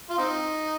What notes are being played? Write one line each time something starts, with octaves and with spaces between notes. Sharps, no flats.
F4
C4 D#4